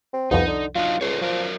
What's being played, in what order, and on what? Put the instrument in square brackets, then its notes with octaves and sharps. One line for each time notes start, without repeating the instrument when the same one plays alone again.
[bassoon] C4
[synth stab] C2 F2 [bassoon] B3 [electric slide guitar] D#4
[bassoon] D3
[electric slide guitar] F#3 D4 D#4 [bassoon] F4
[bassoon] C#2 [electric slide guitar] A4 C5 C#5
[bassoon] F3 [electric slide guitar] F#3 A#4 D5